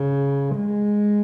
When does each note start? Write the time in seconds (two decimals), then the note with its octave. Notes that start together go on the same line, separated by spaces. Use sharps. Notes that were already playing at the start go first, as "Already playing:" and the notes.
Already playing: C#3
0.56 G#3